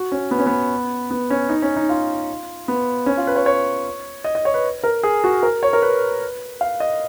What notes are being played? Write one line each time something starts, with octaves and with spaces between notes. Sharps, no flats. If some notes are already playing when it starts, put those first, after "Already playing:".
Already playing: F#4
C#4
B3
C#4
B3
B3
C#4
D#4
C#4
D#4
F4
B3
C#4
F4
B4
C#5
C#5
D#5
D#5
C#5
B4
A#4
G#4
F#4
A#4
C#5
A#4
B4
F5
D#5